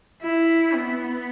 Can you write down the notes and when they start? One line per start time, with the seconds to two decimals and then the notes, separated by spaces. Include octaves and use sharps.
0.22 E4
0.74 B3